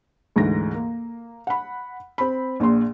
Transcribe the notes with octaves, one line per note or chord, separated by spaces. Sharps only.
D2 G#2 E3 A#6
A#3
F#5 B5
C4 B5
A#1 A#2 C6